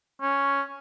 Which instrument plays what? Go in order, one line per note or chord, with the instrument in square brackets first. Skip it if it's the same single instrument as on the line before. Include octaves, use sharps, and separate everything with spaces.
[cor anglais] C#4